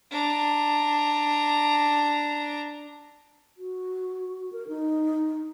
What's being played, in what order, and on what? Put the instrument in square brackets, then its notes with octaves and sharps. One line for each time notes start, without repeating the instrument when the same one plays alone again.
[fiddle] D4 A#5
[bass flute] F#4
A#4
D#4